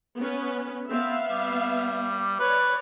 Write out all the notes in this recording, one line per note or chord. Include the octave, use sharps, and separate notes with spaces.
B3 C#4 B4
B3 C4 E5 F5
G3
B4 C#5 D5